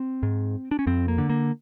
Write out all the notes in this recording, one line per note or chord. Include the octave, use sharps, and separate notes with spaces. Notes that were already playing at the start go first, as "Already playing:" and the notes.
Already playing: C4
G#2
D4
C#4
F2 C4
A#3
D3
A#3